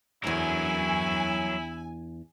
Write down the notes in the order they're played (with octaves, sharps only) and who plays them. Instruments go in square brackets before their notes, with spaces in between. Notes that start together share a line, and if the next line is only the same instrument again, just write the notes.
[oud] E2 D4 [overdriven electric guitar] F#3 A#4 [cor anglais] E4 [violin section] G#5